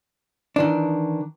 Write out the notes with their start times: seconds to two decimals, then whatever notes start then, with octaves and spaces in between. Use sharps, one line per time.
0.56 D#3 E3 D4